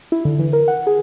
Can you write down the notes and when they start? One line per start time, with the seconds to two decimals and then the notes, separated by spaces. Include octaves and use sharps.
0.12 E4
0.25 D3
0.39 E3
0.53 A#4
0.68 F#5
0.87 G#4